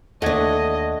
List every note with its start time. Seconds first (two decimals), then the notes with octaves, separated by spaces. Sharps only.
0.22 D#2 A3 D4 D#5 F#5 G#6